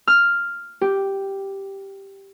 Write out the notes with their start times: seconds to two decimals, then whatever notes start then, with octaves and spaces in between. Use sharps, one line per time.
0.07 F6
0.81 G4